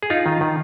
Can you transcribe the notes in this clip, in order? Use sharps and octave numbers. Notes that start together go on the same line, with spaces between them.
G#4
D#4 F4
D#3
D#3